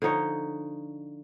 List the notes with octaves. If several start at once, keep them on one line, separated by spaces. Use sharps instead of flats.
D3 F3 D#4 C#5